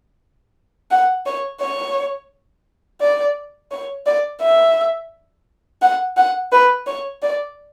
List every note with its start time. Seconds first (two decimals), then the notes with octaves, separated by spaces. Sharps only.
0.91 F#5
1.26 C#5
1.61 C#5
3.01 D5
3.71 C#5
4.06 D5
4.42 E5
5.82 F#5
6.17 F#5
6.52 B4
6.87 C#5
7.22 D5